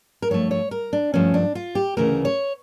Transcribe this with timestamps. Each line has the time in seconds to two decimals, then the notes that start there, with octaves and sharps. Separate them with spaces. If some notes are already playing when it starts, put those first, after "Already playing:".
0.22 A#4
0.30 G2 F3 A3 C#5
0.51 C#5
0.71 A#4
0.93 D4
1.14 G2 F3 A3 C#4
1.34 D4
1.55 F4
1.75 G4
1.97 D2 C#3 E3 A3 A#4
2.25 C#5